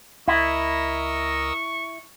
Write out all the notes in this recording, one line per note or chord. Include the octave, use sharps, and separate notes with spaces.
C#2 E4 A#4 D#5 C#6 E6